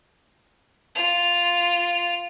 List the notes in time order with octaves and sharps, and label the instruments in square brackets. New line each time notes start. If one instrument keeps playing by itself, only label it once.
[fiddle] F4 F6